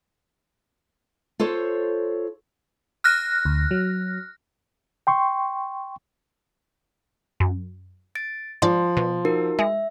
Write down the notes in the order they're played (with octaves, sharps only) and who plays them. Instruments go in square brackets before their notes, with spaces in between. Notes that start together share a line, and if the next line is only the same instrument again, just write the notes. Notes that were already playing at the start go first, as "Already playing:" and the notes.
[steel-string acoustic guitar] F4 A4 C5 C#5
[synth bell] F6 F#6 A#6
[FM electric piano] D2
F#3
[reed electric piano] G5 C6 C#6
[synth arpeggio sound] F#2
[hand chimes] A6 D7
[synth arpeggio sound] G#2 D5 [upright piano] F3 [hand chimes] C6
[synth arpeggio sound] B2
[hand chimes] D#4 F#4 A#4
[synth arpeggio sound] G#3 [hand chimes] E5